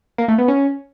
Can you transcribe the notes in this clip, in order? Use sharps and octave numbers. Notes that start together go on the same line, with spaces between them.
A#3
A3
B3
C#4